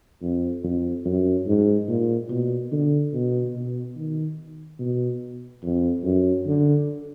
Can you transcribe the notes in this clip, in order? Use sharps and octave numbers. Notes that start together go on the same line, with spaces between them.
F2
F2
F#2
G#2
A#2
B2
D3
B2
B2
D#3
B2
F2
F#2
D3